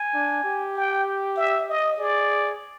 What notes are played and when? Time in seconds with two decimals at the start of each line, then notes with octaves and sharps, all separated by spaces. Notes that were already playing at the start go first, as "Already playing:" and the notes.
Already playing: G#5
0.14 D4
0.44 G4
0.75 G5
1.37 E5
1.69 D#5
1.99 G#4 D5